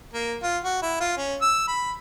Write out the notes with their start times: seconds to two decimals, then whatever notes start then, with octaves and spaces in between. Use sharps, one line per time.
0.13 A#3
0.43 F4
0.64 F#4
0.82 E4
1.00 F4
1.17 C#4
1.41 E6
1.68 B5